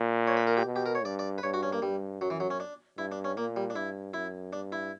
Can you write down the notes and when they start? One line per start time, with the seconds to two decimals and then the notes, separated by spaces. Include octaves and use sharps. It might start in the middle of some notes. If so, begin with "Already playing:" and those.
Already playing: A#2
0.27 C#5
0.37 B4
0.47 A#4
0.57 G4
0.66 B2
0.76 G4
0.86 A#4
0.95 C#5
1.05 G2 D5
1.19 D5
1.38 B4
1.43 G2 C#5
1.54 F#4
1.63 C#4
1.72 A#3
1.82 G2 G3
2.20 F#2 F#3
2.30 E3
2.40 F#3
2.50 C#4
2.60 D4
2.98 G2 E4
3.12 D4
3.24 C#4
3.37 A#2 A#3
3.56 G3
3.70 D4
3.75 G2 E4
4.14 F#2 E4
4.53 G2 D4
4.72 E4